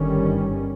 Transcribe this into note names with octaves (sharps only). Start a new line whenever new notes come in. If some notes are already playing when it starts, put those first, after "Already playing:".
Already playing: G1 G2 D#3 G3 C#4